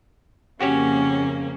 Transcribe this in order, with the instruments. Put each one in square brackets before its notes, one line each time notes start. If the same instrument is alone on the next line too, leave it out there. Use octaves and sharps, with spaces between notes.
[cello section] F2 C#3 A#3 [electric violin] C#4 [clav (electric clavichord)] F#4 G4 C#5